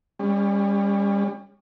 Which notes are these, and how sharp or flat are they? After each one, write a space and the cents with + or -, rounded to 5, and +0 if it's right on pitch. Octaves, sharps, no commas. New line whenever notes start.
G3 +35 C#4 +0